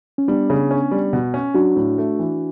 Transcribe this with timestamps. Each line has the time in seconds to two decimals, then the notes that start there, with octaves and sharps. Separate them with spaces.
0.18 C#4
0.28 G3 B3 D4
0.50 C#3
0.71 C#4
0.91 G3
1.13 B2
1.34 C#4
1.55 F#3 D4 F#4
1.76 A2
1.98 A3
2.19 E3